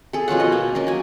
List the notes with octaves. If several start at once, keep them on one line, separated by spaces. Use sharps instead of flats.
G#4 A4
B2 F3 C#4 F#5
D#5
A#3
C#4 A#4 D#5
F#3 G#5